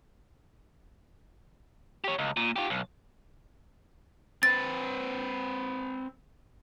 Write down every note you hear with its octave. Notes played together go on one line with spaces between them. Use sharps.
G4 C#5
C#2
A#2
F4 G4
B1
C4 B4 A6